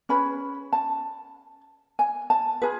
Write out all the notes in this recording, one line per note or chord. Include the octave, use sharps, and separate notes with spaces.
C#4 G#4 B4 B5
A5
G#5
A5
F4 G#4 B4